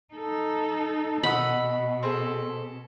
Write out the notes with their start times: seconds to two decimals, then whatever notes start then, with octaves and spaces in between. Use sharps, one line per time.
0.13 D#4 A4
1.23 B2 D#5 F#5 B5 E6
2.03 C4 G#4 A4